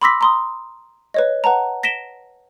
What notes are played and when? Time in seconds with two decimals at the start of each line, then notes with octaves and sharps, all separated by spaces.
0.01 B5 C6 D6 E6 A#6 B6
0.21 A#5 C6 D#6
1.14 B4 C#5 D#5
1.44 B4 F#5 A5 A#5
1.83 A#6 B6 D7 E7 G7